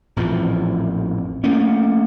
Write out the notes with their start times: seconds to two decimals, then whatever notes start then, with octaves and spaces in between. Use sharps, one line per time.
0.16 A1 F2 A#2 E3
1.44 A3 A#3 C#4